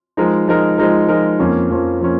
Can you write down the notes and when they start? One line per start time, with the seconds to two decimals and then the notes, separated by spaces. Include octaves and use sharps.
0.17 F3 G#3 D#4 A#4
0.48 F3 G#3 D#4 A#4
0.78 F3 G#3 D#4 A#4
1.08 F3 G#3 D#4 A#4
1.39 F2 F3 A#3 C#4
1.70 F2 F3 A#3 C#4
2.01 F3 A#3 C#4